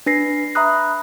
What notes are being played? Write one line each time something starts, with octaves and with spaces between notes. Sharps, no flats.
D4 B4 A#6 C7
E5 A#5 B5 D#6 F#6